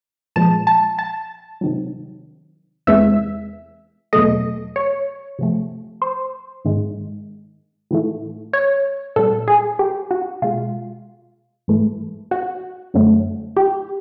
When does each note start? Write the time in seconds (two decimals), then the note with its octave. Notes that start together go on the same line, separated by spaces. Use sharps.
0.36 A#2 F3 G#3 A5
0.67 A5
0.99 A5
1.61 C3 D#3 F#3
2.87 E2 C3 E3 G#3 E5
4.13 E2 B2 F#3 A3 D#5
4.76 C#5
5.39 C3 F3 A3
6.02 C5
6.65 G#2 D#3 G#3
7.91 A2 E3 A3
8.53 C#5
9.16 A#2 G3 A4
9.48 G#4
9.79 G4
10.11 F#4
10.42 B2 G#3 F4
11.68 G#2 E3 A3
12.31 F#4
12.94 F#2 D3 F#3 A3
13.56 G4